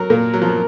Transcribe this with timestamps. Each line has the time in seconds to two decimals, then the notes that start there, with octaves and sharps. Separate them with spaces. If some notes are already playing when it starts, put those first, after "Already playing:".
Already playing: F#3 A#4
0.10 A#2 A#3
0.34 F#3
0.42 F3
0.49 F#3